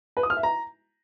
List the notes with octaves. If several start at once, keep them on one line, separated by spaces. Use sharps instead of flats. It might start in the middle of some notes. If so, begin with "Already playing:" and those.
B4
D#6
F6
E5
A#5